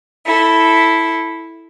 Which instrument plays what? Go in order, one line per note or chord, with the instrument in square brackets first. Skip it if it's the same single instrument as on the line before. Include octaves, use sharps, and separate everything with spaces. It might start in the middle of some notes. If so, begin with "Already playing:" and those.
[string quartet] E4 A4